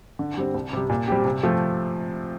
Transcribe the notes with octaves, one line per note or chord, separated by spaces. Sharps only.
D3
G3 C4
C2
C3 G3
A#2
G3 C4 G4
C3
F3 A3 C4 F4